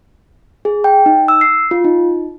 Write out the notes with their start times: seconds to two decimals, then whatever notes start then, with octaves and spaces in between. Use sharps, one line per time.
0.65 G#4
0.84 G5
1.06 D#4
1.28 E6
1.41 C7
1.71 F4
1.84 D#4